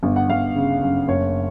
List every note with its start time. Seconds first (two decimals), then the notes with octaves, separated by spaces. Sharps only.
0.03 G1
0.16 F#5
0.29 G1 F5
0.55 C#3
0.81 F#2
1.08 F#1 C#5